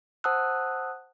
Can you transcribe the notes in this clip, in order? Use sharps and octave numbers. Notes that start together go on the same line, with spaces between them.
C5 F#5 A5 D#6 E6 F#6